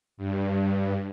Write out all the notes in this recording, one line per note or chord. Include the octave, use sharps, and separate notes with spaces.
G2